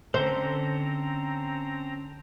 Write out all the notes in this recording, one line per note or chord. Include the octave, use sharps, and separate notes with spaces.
D3 C4 C#4 A4 C5 A#5